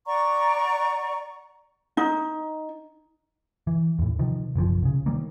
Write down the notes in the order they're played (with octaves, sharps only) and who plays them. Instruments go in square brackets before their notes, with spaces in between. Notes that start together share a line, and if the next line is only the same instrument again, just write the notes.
[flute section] D5 F#5 A#5 C#6
[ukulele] D#4
[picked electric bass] E3
D#2 A2
C3 D#3 F3
F#1 B1 C#3 F3
C2 C#3
D#3 G3 A#3